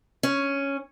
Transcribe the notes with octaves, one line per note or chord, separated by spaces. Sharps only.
C#4